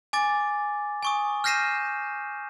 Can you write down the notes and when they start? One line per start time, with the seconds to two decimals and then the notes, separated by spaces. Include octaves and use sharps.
0.13 G#5 D6 A6
1.03 G#5 C#6 D#6
1.44 F6 G6 A#6 C7 D#7 E7